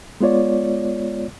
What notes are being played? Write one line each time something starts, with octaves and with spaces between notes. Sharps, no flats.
G#3 B3 F4 C#5 D5